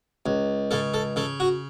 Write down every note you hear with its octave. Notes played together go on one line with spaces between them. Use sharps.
C#2
C#3 A4
A4
C#3 A4
F#4